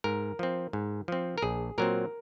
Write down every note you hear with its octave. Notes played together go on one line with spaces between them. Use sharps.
G#2 A#4
F3 C4
G#2
F3 C4
A#4
A#1 G#4
A#2 F#3 C4 A#4